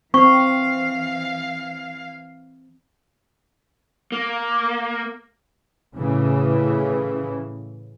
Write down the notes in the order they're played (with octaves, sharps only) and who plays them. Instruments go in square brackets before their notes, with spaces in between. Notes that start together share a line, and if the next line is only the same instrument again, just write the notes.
[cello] E3 F5 [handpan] C4 [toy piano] C#6
[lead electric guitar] A#3
[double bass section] A2 C#3 E3